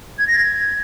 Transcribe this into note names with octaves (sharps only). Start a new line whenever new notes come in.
G#6
A#6
G#6